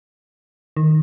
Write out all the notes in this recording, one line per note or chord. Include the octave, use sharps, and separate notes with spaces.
D#3